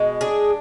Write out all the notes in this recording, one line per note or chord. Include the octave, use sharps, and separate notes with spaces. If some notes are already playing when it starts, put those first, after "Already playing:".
Already playing: B2 G#3
D4 G#4